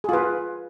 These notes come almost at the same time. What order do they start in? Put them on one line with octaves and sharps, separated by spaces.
G#4 F4 B4